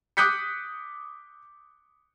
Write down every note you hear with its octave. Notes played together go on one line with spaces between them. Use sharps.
D6 D#6 F#6 G6 B6 C#7